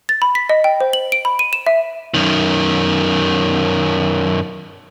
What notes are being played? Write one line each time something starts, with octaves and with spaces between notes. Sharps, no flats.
A6
B5
B6
D#5
G5
C5
F#7
D7
B5
D#7
E7
E5
F#2 D#3